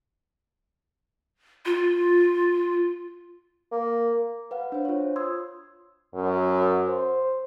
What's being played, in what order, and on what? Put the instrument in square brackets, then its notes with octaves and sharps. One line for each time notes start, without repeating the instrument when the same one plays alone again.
[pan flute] F4
[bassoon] A#3
[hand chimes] B4 F5 F#5
D4 C5
F4 C#5
C6 D#6 E6 G#6
[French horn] F#2
C5